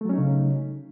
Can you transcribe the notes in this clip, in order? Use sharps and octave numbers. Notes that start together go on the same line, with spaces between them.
C#3 F#3 A3 C#4 D#4